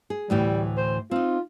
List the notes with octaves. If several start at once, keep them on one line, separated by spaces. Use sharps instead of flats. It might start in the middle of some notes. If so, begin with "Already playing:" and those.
G#4
D2 A2 E3 G3
C5
C4 D#4 F4